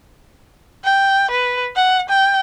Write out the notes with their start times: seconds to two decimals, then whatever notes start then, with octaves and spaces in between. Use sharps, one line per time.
0.84 G5
1.31 B4
1.76 F#5
2.10 G5